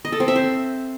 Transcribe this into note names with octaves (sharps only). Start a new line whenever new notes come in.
D#5
A4
C4
E5
C5